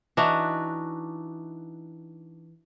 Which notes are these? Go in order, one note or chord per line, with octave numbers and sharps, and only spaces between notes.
E3 D4 D#4 F#4